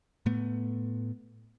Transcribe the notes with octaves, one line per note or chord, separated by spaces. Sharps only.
A2 A3 B3